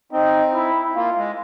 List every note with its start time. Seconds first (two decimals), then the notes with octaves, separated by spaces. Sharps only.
0.12 C4 D#4
0.54 E4
0.95 A#3 F4
1.17 G#3